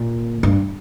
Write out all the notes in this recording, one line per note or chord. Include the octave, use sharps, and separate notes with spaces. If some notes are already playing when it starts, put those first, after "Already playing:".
Already playing: A#2
G2